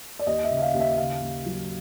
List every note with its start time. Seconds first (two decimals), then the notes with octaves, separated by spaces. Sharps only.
0.19 D5
0.26 D#2 D#5
0.44 E5
0.51 C#3
0.58 E5
0.62 F5
0.74 D#2
0.80 E5
0.97 C#3 F5
1.22 D#2
1.46 F#3